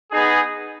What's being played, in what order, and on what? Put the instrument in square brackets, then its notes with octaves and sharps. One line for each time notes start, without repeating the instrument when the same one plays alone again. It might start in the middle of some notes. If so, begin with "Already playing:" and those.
[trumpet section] B3 D#4 G#4